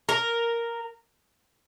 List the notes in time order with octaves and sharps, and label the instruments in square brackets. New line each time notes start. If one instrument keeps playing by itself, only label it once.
[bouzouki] A#4